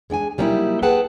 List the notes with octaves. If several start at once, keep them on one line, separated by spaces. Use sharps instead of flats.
G#3 D4 G5 G#5
F#3 G3 A#3 C#4 D#4 E4
G#4 B4 F#5 G5 A5